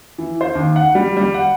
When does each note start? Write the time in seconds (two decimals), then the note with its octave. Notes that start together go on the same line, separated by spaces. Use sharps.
0.18 E3
0.41 C5
0.55 D#2
0.76 F#5
0.95 G3
1.17 G3
1.34 F#5